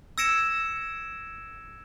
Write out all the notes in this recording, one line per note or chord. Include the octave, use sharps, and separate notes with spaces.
E6 G#6 A#6 C#7 D7 E7